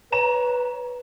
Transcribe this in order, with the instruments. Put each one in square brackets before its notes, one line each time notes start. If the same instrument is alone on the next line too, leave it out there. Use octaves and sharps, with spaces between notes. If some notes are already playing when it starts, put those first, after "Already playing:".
[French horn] B4 [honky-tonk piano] C#5 A#5 E7